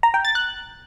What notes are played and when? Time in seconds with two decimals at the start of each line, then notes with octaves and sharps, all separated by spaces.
0.03 A#5
0.14 G5
0.25 A6
0.35 F#6